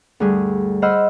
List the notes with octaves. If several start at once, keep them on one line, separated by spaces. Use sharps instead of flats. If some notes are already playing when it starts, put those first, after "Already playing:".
D2 G2 G3 G#4
C5 D#5 F#5 B5 E6 F6